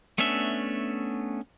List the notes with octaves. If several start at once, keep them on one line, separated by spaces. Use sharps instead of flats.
A3 B3 C#4 D4 E5